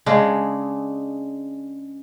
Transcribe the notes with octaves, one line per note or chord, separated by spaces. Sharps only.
C#3 G#3 D4